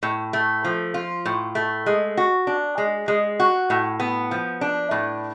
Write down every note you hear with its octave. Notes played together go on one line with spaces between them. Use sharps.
A2
A3
F3
F4
A2
A3
G#3
F#4
D4
G#3
G#3
F#4
A2
B3
F3
D4
A2